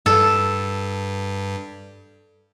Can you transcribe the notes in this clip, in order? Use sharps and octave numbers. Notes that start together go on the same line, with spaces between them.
G2 A4